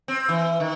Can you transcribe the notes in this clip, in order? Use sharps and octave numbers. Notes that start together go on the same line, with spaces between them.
C4
E3
D#3